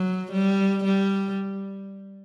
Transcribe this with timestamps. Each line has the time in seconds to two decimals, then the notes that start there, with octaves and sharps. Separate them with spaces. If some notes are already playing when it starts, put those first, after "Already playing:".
Already playing: F#3
0.32 G3
0.85 G3